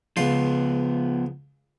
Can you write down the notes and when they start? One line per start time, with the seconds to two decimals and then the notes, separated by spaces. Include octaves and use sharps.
0.17 C#2 F3 B3 F4 C6